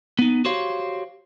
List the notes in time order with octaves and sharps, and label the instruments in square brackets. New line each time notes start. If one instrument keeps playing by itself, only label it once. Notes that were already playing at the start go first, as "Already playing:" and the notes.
[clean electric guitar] B3 D#4
F#4 G4 C5 C#5 F5